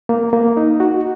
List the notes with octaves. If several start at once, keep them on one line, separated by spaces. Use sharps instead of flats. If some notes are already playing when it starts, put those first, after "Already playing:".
A#3
A#3
D#4
F#4